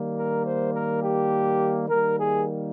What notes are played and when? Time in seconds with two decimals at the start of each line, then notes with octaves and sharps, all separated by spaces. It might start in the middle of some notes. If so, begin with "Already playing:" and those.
Already playing: D#3 G3 A#3
0.17 A#4
0.45 C5
0.74 A#4
1.02 G4
1.89 D#3 G3 A#3 A#4
2.18 G#4